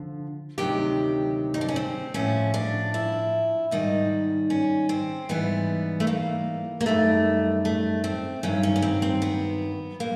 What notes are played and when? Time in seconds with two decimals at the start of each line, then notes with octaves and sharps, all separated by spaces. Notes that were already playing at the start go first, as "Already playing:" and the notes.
Already playing: D3 F3
0.58 D2 C3 D#3 F#3 G4
1.54 D#4
1.61 D4
1.68 C#4
1.76 C4
2.14 A2 F3 C#4
2.54 D4
2.94 E4
3.71 G#2 D#3 G3 D#4
4.50 C#4
4.89 C4
5.29 G#2 E3 G3 B3
6.00 A3
6.07 A#3
6.81 A#3
6.86 F#2 D#3 G3 A3
7.65 A3
8.04 C4
8.43 G2 D#3 F#3 C#4
8.63 C#4
8.76 B3
8.82 C4
9.02 C4
9.22 B3
10.00 A#2 A#3